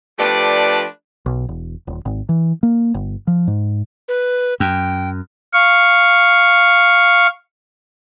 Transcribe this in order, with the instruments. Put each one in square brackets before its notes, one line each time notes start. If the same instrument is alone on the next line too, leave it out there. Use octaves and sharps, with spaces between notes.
[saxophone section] F3 A3 D4 G4 B4 D5
[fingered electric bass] B1
E1
D#1
G#1
E3
A#3
G1
F3
G#2
[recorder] B4
[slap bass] F#2 [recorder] G5
[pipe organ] F5 C#6